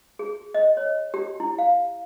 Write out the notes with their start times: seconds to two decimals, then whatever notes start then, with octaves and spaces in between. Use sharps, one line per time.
0.19 G#4
0.54 D#5
0.77 C#5
1.14 G4
1.40 E4
1.59 F5